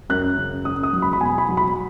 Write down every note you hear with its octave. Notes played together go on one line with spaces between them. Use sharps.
F#2 F#6
C#3
C#3 D#6
D#6
F#3
B5
B5
B2 G#5
B5
F#3
B5